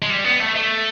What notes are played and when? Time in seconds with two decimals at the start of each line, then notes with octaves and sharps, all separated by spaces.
0.02 G#3
0.10 G3
0.24 B3
0.40 A3
0.55 A3